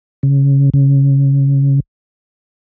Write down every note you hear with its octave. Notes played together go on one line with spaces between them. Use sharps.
C#3
C#3